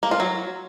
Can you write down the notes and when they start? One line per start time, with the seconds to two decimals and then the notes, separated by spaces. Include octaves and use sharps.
0.03 A#3
0.11 F4
0.20 F#3